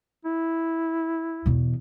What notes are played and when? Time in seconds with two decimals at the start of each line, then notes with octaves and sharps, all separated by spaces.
0.25 E4
1.46 E2 B2